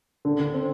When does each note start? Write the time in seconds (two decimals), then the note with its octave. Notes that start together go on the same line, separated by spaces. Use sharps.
0.25 D3
0.40 D3
0.54 C4